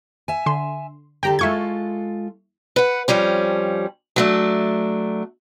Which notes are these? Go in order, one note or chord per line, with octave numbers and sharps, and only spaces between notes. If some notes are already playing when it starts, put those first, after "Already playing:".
E5 G#5
D3 C6
D3 G4 A4 G5 A#5
G#3 F4 A4 E5 C#6 G#6
B4 F#5
F2 F3 G3 C#4
F#3 A3 D4